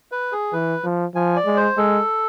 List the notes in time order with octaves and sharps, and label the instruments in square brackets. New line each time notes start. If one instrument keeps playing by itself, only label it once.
[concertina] B4
G#4
[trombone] E3 [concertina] B4
[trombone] F3
[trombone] F3 [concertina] G#5
[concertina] D5
[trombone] G#3
[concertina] C5
[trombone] G#3 [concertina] A4